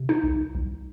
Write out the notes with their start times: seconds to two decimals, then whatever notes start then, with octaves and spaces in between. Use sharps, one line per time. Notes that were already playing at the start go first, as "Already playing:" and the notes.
Already playing: C3
0.09 D#4
0.23 C2
0.55 C2